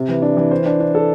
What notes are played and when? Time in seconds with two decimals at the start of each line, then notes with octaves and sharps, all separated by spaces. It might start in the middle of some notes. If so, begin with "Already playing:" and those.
Already playing: C3
0.08 E3
0.22 D4
0.37 E3
0.51 C5
0.66 D4
0.80 D4
0.95 A4